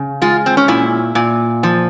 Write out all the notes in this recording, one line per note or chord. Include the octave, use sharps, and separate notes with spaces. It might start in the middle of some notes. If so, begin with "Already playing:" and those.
Already playing: C#3
G#3 F4
C4
C#4
A#2 E4
A#2
F3